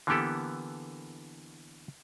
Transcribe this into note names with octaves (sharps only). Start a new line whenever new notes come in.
D3 E3 A#3 B3 G4 A4